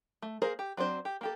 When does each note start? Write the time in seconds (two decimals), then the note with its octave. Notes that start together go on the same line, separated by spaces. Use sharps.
0.22 A3
0.42 A#3 G#4 A#4 C5
0.59 G4
0.77 F#3 C4 D4 C5
1.05 G4
1.21 A#3 G4 A4